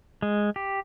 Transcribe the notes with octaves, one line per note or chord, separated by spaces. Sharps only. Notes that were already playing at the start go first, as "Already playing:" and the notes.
G#3
G4